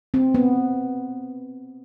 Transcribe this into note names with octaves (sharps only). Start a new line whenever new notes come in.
C4
B3